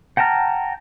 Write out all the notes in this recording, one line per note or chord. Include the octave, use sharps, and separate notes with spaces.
F#5 G5 A5 A#5 F6